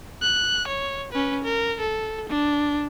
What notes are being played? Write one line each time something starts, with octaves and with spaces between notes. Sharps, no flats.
F#6
C#5
C#4 B4
A#4
A4
D4